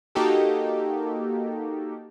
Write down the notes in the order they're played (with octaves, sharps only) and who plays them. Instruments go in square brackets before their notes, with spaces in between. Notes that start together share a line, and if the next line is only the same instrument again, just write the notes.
[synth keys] A#3 D#4 F#4 G4 A4